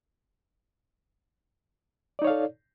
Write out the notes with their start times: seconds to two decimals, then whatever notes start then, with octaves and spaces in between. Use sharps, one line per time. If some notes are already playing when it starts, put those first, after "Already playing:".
2.19 D5
2.22 D#4
2.24 C#5
2.27 F5
2.30 A4